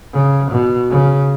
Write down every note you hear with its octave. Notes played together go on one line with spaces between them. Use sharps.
C#3
B2
C#3